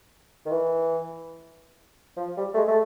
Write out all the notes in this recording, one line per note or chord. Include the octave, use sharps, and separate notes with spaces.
D#3
E3
F3
G3
A3
G#3
A3